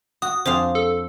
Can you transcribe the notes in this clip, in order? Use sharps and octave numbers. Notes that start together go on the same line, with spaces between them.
F#4 D#6
F2 D4 C5 F5
A4